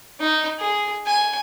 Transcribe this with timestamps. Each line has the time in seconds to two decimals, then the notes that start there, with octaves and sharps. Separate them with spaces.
0.20 D#4
0.59 G#4
1.06 G#5